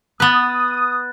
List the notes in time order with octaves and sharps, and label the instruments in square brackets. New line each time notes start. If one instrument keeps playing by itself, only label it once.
[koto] B3 B4 [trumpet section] D#6 [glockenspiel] F#6 A6